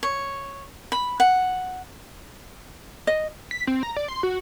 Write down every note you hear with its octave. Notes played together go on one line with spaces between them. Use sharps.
C#5
B5
F#5
D#5
B6
C4
A#5
D5
C6
F#4